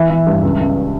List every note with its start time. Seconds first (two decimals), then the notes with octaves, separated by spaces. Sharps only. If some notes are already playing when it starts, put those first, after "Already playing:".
Already playing: E3 E5
0.10 E3
0.27 G2
0.43 C#2
0.60 C#2